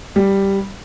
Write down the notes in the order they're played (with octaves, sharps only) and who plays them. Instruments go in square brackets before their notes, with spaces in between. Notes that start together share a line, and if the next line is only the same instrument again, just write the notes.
[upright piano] G3